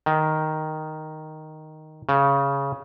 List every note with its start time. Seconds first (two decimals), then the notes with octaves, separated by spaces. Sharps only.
0.06 D#3
2.09 C#3